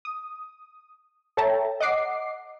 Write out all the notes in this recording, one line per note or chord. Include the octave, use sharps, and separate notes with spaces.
D#6
A4 C#5 E5 G5 A5 A#5
D#5 F#5 D6 C7